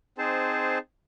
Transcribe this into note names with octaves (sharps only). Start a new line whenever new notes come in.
C4 D#4 G#4 C5 A5